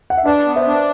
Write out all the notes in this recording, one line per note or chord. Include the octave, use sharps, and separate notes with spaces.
F#5
E5
D4 B4 D5
B3
C5 E5
D4